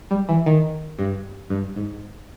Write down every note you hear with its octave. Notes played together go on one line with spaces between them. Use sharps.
G3
E3
D#3
G2
G2
G#2